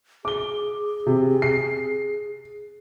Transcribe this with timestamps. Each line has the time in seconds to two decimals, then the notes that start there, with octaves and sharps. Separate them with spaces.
0.25 G#4 D6 G7
1.06 C3
1.42 C7